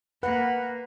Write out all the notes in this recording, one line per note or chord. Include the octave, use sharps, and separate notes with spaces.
A#3 B4 F#5